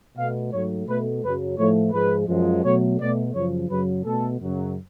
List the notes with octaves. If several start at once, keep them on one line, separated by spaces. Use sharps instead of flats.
B2 A3 F5
G#2 F#3 A3 C#5
B2 A3 B4
F#2 C#3 F#3 B4
A2 F3 A3 C#5
G#2 F3 G#3 B4
F#2 F3 G#3
B2 F#3 A3 C#5
B2 A3 D5
F#2 C#3 F3 C#5
F#2 C#3 F#3 B4
B2 A3 A4
F#2 C#3 F#3